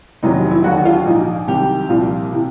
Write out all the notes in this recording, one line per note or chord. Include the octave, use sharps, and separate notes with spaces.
F1 E2 C3 D#3 F#3 D#4
E4
D#2 D3 F#3 F#4
F#4
F4
A#1 G#2 F3 D#4
C2 C3 D#3 F#3 G4
C2 A#2 F3
C3 E3